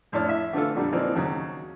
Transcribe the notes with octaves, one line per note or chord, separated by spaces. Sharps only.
F2 A2 D4 C#5 A5 F6
E5
D3 E3 A3 F4 A4
F2 A#2 D3 G3
E3 F3 A#3 C4 D4 D#4
D#2 C#3 F#3